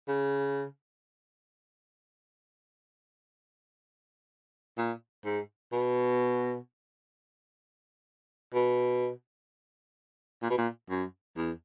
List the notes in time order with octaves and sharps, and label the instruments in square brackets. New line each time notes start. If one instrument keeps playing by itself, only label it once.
[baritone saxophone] C#3
A#2
G#2
B2
B2
A#2
B2
A#2
F#2
E2